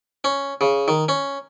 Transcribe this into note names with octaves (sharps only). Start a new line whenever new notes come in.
C#4
C#3
D#3
C#4